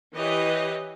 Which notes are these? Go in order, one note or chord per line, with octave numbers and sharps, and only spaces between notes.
E3 G4 B4 C#5 D#5